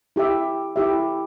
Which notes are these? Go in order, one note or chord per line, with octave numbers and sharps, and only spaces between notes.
E4 G4 E5
E4 G4 E5